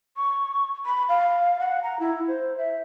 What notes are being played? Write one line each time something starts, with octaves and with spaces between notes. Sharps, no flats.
C#6
B5
F5
F#5
A#5
E4
C5
E5